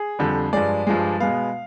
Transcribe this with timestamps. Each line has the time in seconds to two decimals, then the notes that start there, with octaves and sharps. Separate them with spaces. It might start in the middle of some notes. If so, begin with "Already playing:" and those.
Already playing: G#4
0.19 F2 D3 G3
0.53 G2 F3 G#3 D5
0.87 G2 F3 G#3
1.20 B2 G#3 B3 F5